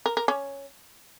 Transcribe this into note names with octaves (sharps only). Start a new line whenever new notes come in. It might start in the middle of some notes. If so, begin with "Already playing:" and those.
A#4
A#4
C#4